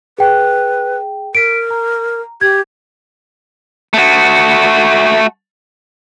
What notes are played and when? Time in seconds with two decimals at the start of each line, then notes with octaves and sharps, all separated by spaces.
0.18 G#4 B4 G5
1.35 A#4 B6 D7
1.71 A#5
2.41 G4 G#6
3.94 A3 F#4